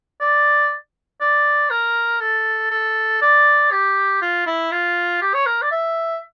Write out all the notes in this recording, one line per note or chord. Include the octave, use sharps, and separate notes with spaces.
D5
D5
A#4
A4
A4
D5
G4
F4
E4
F4
G4
C#5
A#4
D5
E5